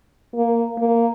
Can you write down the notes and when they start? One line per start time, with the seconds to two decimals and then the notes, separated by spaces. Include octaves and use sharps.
0.35 A#3
0.78 A#3